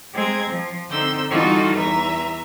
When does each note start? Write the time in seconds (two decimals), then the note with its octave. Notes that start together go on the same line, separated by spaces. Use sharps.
0.13 G#3 C4 A#5 G#6
0.50 F3
0.90 D3 C4 D#4 E6 G6
1.30 E3 G3 D#4 F4 F#4 A4
1.75 E2 B4 E5 A#5